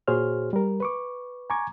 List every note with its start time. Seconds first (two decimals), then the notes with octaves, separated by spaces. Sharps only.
0.08 A#2 F#4 G#4 C5 C#5 F6
0.53 G3 A#4
0.80 B4 C#6 D6
1.50 G#5 A#5 C#6 D6 G#6